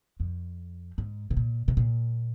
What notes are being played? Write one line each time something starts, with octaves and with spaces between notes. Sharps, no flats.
F2
G#2
C3
A#2
C3
A#2